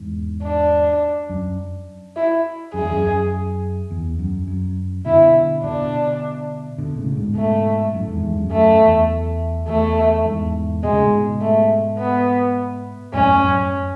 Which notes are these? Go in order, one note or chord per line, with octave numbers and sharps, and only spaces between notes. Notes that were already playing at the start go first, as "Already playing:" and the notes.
Already playing: E2 G#2
D4
F#2
E4
F#2 G#4
E2
F#2
E2
F#2
F#2
B2 D3 E4
B2 D3 D4
B2 D3
A2 C#3
G#2 B2
A3
F#2 A2
E2 G#2
E2 G#2
F#2
F#2 A3
E2
E2 A3
E2 G#2
B2 G#3
C#3
G#2 B2
A3
B3
F#2 A2 C#4
F#2